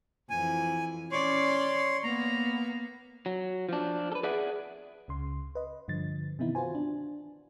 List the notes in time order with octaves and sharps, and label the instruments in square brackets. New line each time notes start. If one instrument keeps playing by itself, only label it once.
[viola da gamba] F2 E3 [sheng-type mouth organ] G#5
[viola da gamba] C#4 D5 [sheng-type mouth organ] C#5 C6
[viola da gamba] A#3 B3 [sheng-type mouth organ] A#5
[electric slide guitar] F#3
F3 D4
A4 B4
G#4 B4 D5 E5 F#5
[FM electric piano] C#2 C#3 C6
B4 D#5
G2 D3 F3 A6
C3 D#3 E3 B3 D#4 E4
F4 F#4 B4 C5 G#5
D4